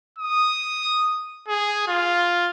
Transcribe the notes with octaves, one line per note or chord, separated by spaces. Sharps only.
D#6
G#4
F4